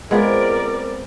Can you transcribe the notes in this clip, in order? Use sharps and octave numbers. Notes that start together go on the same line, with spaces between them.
G#3 B3 C4 F4 A#4 D5